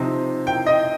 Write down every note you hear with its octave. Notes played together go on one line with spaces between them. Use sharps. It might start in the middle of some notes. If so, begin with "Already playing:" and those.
Already playing: C3 F3 C4 D#4
G5
D#5